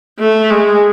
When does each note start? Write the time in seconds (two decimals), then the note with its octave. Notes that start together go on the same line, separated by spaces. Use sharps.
0.20 A3
0.50 G#3